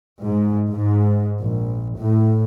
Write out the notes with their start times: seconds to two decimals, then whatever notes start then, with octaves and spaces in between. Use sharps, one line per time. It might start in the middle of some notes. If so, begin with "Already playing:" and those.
0.24 G#2
0.70 G#2
1.41 A#1
1.98 A2